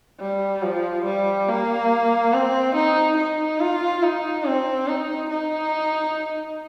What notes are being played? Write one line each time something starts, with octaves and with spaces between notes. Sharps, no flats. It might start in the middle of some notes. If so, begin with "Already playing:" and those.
G3
F3
G3
A#3
C4
D#4
D#4
F4
D#4
C4
D#4
D#4